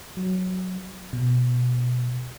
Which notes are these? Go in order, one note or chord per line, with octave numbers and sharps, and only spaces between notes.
F#3
B2